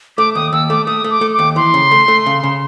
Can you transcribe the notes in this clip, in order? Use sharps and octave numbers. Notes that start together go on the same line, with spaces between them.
A3 D6
D#2 D#6
D#2 E6
A3 D6
A3 D#6
A3
D6
A3
D6
D#2
E3 C6
C#3
A3
A3
C#3
C#3